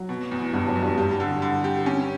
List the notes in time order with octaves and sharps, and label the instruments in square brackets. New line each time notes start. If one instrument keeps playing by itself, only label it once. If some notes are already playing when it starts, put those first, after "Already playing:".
Already playing: [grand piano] F#3
[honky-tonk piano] B2
E2
[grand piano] G2 G3 [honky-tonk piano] B2
[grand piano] F#3
[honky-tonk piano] E2
[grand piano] G2 G3
[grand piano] G2 G3 [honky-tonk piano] G4
[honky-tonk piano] D3
D3
G4
C#4